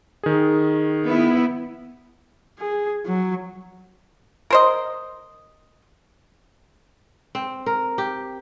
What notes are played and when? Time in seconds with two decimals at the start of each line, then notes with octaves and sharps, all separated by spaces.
0.23 D#3 G#4
1.08 B3 E4
2.59 G#4
3.06 F#3
4.50 A#4 C5 D#5
7.35 C4
7.66 A#4
7.98 G4